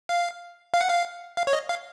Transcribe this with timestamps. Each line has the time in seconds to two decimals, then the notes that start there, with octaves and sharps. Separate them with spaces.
0.09 F5
0.74 F5
0.81 F#5
0.89 F5
1.37 F5
1.47 C#5
1.53 D#5
1.69 F5